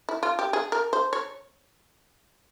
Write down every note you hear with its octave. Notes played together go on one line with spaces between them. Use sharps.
E4
F4
G4
G#4
A#4
C5
C#5